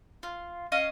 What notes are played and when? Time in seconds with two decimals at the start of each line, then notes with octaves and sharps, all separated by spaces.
0.23 F4
0.72 C#4 D#5 F5